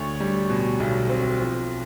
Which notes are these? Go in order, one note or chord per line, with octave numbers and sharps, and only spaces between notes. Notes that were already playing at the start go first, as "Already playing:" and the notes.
Already playing: D2 C#5
G3
B2
B1
C4
F3